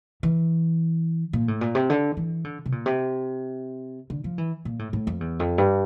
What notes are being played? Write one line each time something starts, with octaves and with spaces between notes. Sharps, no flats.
E3
A#2
A2
A#2
C3
D3
E3
D3
C3
A#2
C3
D3
F3
E3
A#2
A2
A2
F2
E2
F2
G2